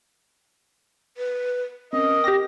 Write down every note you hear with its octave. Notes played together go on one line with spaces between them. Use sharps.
B4
C4 C#4 A#4 D#5
G4 G5 D6 A#6